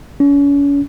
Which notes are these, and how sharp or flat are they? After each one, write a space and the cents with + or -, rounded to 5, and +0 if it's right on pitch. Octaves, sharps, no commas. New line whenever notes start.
C#4 +35